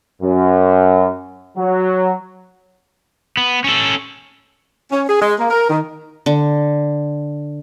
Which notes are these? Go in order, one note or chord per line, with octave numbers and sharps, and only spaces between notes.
F#2
F#3
B3
C#4 A4
C#4
G#4
G#3
A#3
A#4
D#3
D3